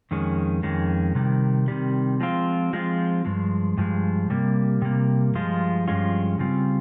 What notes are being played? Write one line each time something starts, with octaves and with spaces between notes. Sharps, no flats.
F2 D#3 G#3 C#4
F2 D#3 G#3 C#4
C3 D#3 G3
C3 D#3 G3
F3 G#3 C4 F4
F3 G#3 C4 F4
G2 F3 G#3
G2 F3 G#3
C3 G3 A#3
C3 G3 A#3
G2 F3 G#3 F4
G2 F3 G#3 C#4 F4
C#3 G3 C4 F4